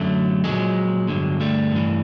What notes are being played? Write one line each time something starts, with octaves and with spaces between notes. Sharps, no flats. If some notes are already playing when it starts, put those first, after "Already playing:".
Already playing: F#2 D3 F#3 A3
A#2 F3 F#3 G#3
G2 D3 F#3
G3 A3
G2 E3